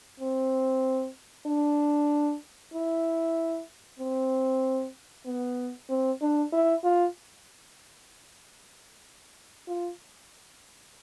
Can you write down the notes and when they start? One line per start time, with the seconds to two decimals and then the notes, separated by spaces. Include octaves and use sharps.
0.20 C4
1.46 D4
2.74 E4
3.99 C4
5.26 B3
5.89 C4
6.21 D4
6.52 E4
6.84 F4
9.67 F4